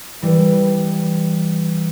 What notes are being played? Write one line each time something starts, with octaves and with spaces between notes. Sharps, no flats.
E3 G3